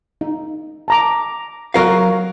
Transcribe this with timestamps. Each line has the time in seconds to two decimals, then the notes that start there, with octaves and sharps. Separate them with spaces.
0.21 D#4
0.88 A5 A#5 D6
1.74 F#3 A#4 F5